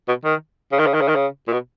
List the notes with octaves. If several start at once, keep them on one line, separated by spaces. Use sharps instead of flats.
B2
D#3
C#3
D#3
C#3
D#3
C#3
D#3
C#3
A#2
B2